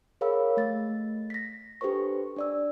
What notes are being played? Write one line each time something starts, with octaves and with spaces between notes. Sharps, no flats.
G#4 A#4 C#5 F5 B5 E6
A3 A6
A#6 B6
D4 G4 A4 B4 C5 C#6
D4 D5 E6